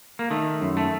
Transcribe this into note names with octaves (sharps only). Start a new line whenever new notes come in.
A#3
D#3 A3
F#2
A3